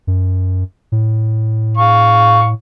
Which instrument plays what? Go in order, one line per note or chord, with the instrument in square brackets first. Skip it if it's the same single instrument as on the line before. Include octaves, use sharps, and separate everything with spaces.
[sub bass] F#2
A2
[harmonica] F5 C#6